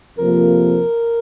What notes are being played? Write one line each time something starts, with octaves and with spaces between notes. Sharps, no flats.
F2 C3 F3 A#3 A#4